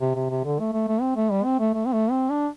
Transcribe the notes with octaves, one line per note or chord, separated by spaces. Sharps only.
C3
C3
C3
D3
A3
A3
A3
C4
A3
G3
C4
A3
A3
C4
A3
C4
D4